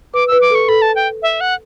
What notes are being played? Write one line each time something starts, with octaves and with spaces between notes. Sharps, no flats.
B4 D6
B4 E6
D6
A4 C#6
A4 B5
A5
G5
E5
F#5